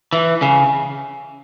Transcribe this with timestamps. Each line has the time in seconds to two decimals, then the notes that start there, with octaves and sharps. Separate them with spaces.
0.13 E3
0.42 C#3